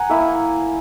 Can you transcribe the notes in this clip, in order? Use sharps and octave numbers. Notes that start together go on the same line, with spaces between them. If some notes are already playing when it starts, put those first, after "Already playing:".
Already playing: F#5 G#5 A#5
A#3 E4 E5